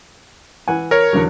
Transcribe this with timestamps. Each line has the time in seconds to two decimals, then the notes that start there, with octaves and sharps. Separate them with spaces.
0.68 E3 F#5 G#5
0.91 A#4 C#5
1.13 E2 D3 F#3